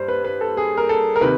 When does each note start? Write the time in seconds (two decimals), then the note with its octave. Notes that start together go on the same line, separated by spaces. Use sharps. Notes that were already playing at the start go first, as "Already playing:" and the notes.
Already playing: G2 C5
0.08 B4
0.25 B4
0.41 A4
0.57 G#4
0.77 A#4
0.89 A4
1.16 A#4
1.21 C3 D#3 B4